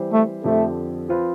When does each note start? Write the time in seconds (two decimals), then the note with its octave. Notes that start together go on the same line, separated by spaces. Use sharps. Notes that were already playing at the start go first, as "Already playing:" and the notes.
Already playing: E3 G3 C4 G4 C5
0.12 A3
0.44 F2 D3 F3 A3 C4 G4
1.09 F3 C4 F4 B4